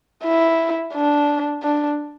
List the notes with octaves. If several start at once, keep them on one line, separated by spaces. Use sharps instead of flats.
E4
D4
D4